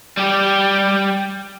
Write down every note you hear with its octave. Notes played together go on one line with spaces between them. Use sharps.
G3 G4